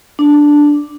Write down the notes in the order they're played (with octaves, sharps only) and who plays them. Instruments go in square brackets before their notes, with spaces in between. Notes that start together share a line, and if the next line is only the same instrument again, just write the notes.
[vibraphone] D4